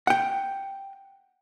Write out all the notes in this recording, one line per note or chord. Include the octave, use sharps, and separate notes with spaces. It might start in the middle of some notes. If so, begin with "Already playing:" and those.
F#5 G5